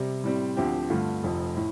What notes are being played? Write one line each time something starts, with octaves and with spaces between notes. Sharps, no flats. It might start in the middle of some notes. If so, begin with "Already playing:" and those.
Already playing: C3 G3
A2 G3 C4
D2 D3 F3 C4 G4
G2 D3 A3 F4
F1 F2 F3
A2